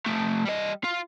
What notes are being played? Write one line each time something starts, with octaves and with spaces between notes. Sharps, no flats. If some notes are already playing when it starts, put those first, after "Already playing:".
F3 A3
G3 D#5
F4